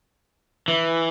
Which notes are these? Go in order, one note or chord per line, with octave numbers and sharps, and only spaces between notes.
E3